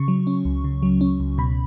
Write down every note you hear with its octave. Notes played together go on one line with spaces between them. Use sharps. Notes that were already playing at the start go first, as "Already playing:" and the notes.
Already playing: C#3 C#6
F#3
C#4
C#2
C#3
F#3
C#4
C#2
B2 B5